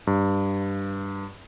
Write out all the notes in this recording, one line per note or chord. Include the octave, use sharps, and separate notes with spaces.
G2